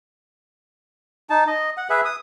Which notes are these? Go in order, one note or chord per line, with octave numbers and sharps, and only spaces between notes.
D#4 A5
D#5
F#5
G#4 B4 E5
D#6